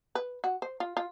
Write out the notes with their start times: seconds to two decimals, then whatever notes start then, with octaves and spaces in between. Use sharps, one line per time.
0.15 B4
0.44 F#4
0.62 C5
0.80 F4
0.97 F4